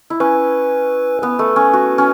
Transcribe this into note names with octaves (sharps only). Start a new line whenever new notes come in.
E4
C#4 B4
B3 B4
A3
C#4
F#4
C#4